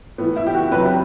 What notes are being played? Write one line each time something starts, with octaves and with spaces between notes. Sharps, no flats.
A2 E3 B3
E4
G4
F#4
C3 F#3 B4
G4